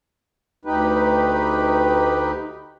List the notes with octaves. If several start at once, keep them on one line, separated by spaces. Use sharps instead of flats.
D2 D#4 G4 B4